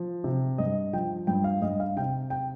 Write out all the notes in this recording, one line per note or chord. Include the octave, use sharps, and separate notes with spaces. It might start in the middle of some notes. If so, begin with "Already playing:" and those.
Already playing: F3
C3
G2 D#5
F3 G5
G2 G5
F5
G2 D#5
F5
C3 G5
G5